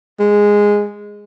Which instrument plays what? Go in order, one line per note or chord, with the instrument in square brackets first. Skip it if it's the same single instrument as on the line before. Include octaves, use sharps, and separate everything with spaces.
[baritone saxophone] G#3